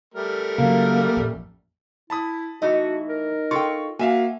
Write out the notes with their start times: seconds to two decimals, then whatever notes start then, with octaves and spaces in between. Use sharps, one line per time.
0.14 G3 A3 A#4
0.58 C#3 F#3 A#3
1.17 A1 F2 A#2
2.10 E4 A5 B5 D#6
2.62 E3 A3 D#4 F#4 D#5
3.09 A#4
3.51 F4 A4 G5 C#6
3.99 A#3 F#4 E5 F5 G#5